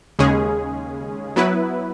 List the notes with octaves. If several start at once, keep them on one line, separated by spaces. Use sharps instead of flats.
D#2 C#3 G#3 C#4 G#4
F#3 B3 E4 B4